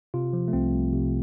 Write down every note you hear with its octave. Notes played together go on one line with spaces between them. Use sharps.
C3 F4
F3
A3
C2 C4
C2
C3